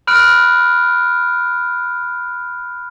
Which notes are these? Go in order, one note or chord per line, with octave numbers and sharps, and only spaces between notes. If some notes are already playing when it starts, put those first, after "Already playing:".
B5 F6 F#6 D7